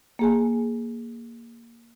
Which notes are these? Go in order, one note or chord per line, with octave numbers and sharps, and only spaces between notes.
A#3 G#4 G#5